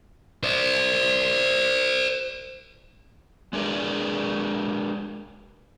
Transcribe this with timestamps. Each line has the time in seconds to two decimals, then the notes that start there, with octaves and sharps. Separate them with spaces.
0.43 C5 D5
3.53 G#3 D4 G#4 A#4 B4 D5